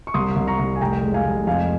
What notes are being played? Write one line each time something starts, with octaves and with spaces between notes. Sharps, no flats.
C#6
C2 C6 D#6
C2
A#5 C#6
C2
G#5
F1 G5 A#5
G#3
F5 G#5
F1
F2 F5 G#5